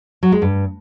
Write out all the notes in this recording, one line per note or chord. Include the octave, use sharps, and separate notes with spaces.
F#3
G#3
G2